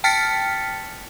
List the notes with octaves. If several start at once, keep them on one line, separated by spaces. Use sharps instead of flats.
G5 A5 F6 A6 B6 C#7